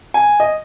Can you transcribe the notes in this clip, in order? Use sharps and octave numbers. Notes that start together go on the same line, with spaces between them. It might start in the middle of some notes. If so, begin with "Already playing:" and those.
G#5
D#5